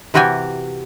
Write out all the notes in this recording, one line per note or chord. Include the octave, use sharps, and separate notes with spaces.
C3 E3 F#4 G4 G5 G#5